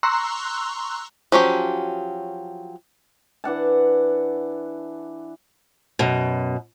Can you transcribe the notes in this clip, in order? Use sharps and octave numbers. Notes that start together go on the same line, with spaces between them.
A#5 C6 C#6 E6 F#6
F3 F#3 C#4 G4
E3 D4 F#5 A5
F#2 B2